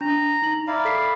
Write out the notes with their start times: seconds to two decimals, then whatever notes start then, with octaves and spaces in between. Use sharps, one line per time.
0.01 D4 A#5
0.42 D#4 F#7
0.68 E4 D5 F5 A#5
0.85 A4 B6 C7